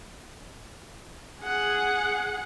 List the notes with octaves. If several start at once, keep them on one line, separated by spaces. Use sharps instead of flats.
G#4 F#5